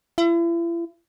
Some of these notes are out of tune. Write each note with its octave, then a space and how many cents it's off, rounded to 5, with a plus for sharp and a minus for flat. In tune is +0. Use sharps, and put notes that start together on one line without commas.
E4 +40